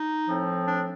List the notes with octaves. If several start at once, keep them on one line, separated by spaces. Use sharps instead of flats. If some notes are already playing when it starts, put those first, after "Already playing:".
Already playing: D#4
A2 F3 C4
D4